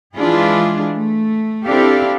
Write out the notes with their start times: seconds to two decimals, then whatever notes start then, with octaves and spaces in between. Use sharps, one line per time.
0.15 E3 G#3 D4 E4 F4 G#4
0.92 A3
1.65 C4 D4 E4 G4 A4 F5